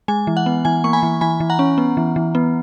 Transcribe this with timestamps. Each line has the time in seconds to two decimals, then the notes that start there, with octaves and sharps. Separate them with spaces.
0.08 G#3 G#5
0.27 E3
0.37 F#5
0.46 B3
0.65 E3 G#5
0.84 A#3 C#6
0.93 G#5 B5
1.03 E3
1.21 E3 G#5 B5
1.40 E3
1.50 F#5 A#5
1.59 C#4
1.78 B3
1.97 E3
2.16 E3
2.35 B3